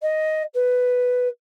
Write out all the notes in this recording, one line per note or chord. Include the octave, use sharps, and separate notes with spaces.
D#5
B4